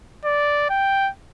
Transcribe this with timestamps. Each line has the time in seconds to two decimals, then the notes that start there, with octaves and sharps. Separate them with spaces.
0.25 D5
0.70 G5